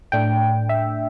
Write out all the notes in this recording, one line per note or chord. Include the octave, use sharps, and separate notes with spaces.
A2 A3 D4 G5
E5